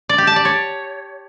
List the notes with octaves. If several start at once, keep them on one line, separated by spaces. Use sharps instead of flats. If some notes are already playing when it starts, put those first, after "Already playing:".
D5
G4
A5
D5
C#5